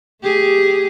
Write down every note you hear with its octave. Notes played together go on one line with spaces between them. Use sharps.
A3 G4 G#4